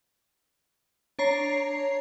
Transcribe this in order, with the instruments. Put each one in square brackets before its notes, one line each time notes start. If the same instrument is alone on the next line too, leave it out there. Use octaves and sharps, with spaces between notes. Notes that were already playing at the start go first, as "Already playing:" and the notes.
[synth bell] D4 C#5 A#5 C7